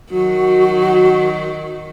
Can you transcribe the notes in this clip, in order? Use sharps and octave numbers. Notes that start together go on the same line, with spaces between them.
D#3 F#3 F#4